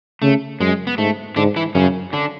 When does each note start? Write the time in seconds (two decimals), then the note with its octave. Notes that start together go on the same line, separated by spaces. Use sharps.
0.22 C#3 A3
0.60 F#2 G#3
0.87 B3
0.98 G#2 A3
1.36 G#2 D3 D4
1.56 E3 E4
1.75 F#2 C#3 C#4
2.13 D3 D4